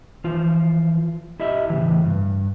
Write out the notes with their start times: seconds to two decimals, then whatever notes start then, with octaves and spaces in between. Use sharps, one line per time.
0.24 E3 F3 F4
1.40 E4 G4 D#5 E5
1.70 A2 C#3 E3
2.04 G2